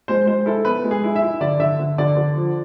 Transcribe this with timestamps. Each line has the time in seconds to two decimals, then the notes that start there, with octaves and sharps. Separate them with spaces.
0.08 G#3 C5
0.27 G#3 C5
0.46 E4 A4
0.65 B3 B4
0.84 G#3
0.91 G#4
1.04 E4
1.16 E5
1.23 E4
1.41 D3 D5
1.60 D3 E5
1.79 D3
1.98 D3 D5
2.17 D3
2.35 F3